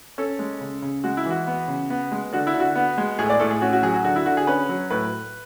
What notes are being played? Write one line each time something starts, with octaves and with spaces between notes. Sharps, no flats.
C#4 A4
G#3
C#3
C#3
G#3 F#4
E4
E3
F#4
B3
C#3
B3
G#3
D3 F#4
E4
D3
F#4
B3
G#3
A2 G#4
D5
A2 A4
G#4
C#4 F#4
F#4
F#3 G#4
F#4
D3 F#4
E4
D3 F#4
G#4
C#4 B4
F#3
A2 B4